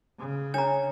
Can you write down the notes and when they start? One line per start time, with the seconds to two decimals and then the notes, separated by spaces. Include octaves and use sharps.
0.19 C#3
0.54 D4 C#5 G#5 A#5